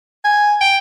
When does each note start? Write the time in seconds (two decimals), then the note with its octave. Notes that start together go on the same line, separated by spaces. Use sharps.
0.25 G#5
0.61 G5